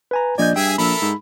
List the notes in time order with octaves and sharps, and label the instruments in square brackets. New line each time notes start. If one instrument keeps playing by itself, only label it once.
[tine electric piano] B4 G#5 A#5
[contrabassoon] A#1 [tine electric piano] D5 D#5 G6 [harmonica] G#5
[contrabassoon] G2 [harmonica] G#4 E5 G#5 [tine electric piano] G5
[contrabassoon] A#1 [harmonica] A4 A#4 E5 [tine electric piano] B5
[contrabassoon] G#2